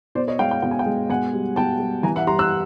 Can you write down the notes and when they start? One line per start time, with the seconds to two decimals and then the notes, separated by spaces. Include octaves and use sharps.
0.15 B2 C5 D5
0.28 C#5 D#5
0.39 G#3 F5 G5
0.50 F5 G5
0.62 B2 G5
0.71 G#5
0.79 F5 G5
0.86 G#3
1.10 B2 F#5 G#5
1.33 G3
1.56 B2 G5 A5
1.80 G3
2.03 E3 G#5 A#5
2.16 E5 F#5
2.27 G3 A#5 C6
2.39 E6 F#6